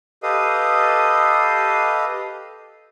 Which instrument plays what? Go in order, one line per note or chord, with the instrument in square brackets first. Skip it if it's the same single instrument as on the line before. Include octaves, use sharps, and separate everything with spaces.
[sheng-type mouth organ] G4 A4 B4 D#5 F5 D#6